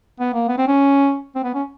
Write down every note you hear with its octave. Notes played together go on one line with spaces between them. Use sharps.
B3
A#3
B3
C4
C#4
C4
B3
C#4